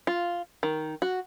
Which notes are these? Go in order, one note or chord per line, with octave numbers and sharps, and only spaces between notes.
F4
D#3
F#4